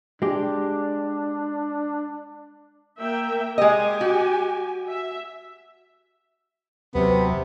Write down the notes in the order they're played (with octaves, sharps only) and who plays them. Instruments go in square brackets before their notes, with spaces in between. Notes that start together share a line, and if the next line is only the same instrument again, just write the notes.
[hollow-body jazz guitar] G#3 G4 [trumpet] D4
[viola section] A#3 E5 G5
[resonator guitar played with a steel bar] G#3 D#5 [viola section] G4 G#5
[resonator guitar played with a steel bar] F#4
[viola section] E5
[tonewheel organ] D#2 F#3 [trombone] C3 [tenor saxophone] B3